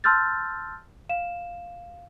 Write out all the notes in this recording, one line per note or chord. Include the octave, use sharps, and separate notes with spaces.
A5 C6 E6 F6 G6 A6
F5 E7